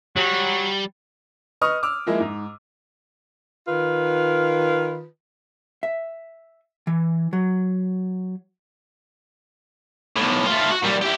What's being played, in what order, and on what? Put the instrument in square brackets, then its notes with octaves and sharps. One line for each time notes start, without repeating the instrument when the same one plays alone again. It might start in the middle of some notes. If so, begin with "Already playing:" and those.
[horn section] F#3 [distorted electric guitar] G3
[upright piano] B4 D#5 C#6 D#6 F6
D6 E6 F6
F3 G#3 A#3 E4
G#2
[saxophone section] D#3 F4 B4
[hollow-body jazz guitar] E5
E3
F#3
[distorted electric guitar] B1 A2
A3 F4
F#4
A#2 G3
E4 G4